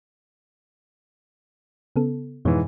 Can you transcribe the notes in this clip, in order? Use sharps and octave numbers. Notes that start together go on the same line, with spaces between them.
C#3 B3 A4
F2 G#2 B2 E3 C#5